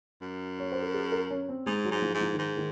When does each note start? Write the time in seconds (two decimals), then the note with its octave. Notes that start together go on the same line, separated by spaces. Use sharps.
0.21 F#2
0.59 C#5
0.72 C5
0.83 A#4
0.94 G#4
1.12 A#4
1.31 C#4
1.49 C4
1.66 G#2 G#3
1.85 F#3
1.91 G#2
2.02 F3
2.14 G#2
2.21 F3
2.33 D#3
2.39 G#2
2.57 D#3